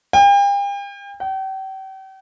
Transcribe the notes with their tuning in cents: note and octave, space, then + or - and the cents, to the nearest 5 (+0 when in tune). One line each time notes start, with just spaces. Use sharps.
G5 +40
G5 -40